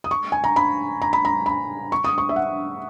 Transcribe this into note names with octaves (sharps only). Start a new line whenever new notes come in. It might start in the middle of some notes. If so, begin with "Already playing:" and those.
D#6
C#6
G#5
A#5
B5
A#5
B5
A#5
B5
C#6
D#6
C#6
E5
F#5